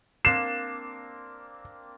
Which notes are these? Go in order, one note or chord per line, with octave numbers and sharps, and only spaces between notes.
A#3 C4 D4 C7 E7